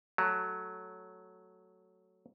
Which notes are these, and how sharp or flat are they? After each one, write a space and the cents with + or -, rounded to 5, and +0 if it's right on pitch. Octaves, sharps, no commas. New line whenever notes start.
F#3 +0 A3 +0